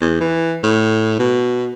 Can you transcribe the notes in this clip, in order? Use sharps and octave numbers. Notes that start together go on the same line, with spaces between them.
E2
E3
A2
B2